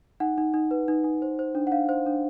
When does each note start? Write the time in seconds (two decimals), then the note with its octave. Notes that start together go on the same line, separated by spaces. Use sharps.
0.20 D#4 F#5
0.38 D#4
0.54 D#4
0.71 B4
0.88 D#4
1.04 D#4
1.22 C5
1.39 C5
1.55 D4
1.67 F#5
1.72 D4 F5
1.89 C5
2.06 D4